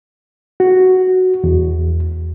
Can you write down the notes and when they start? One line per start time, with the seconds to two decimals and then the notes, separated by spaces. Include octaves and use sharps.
0.60 F#4
1.44 E2